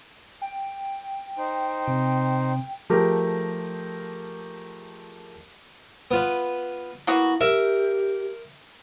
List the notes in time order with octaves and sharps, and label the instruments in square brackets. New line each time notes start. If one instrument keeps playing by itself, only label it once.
[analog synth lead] G5
[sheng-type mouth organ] D#4 C5
[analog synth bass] C3
[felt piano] F3 A3 G4 G#4 A#4
[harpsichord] B3 F4 B4
[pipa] A#3 B3 F#4 [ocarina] E4
[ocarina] G4 [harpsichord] A#4 [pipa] E5